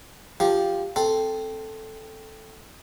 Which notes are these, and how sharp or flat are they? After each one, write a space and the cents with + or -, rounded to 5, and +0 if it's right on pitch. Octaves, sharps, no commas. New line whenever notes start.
F3 +0 G4 +0
C4 +0 A4 +0